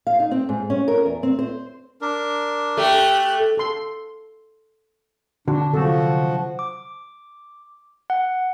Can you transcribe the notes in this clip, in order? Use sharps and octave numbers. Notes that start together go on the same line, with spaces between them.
F5
D#4
C4
G#2
C#4
A#4
E2
C4
C5
D4 A#4
A3 G4 F#6
A4 C6
D3 D4 F#4
C3 F3 F#3 F#4 A4
D6
F#5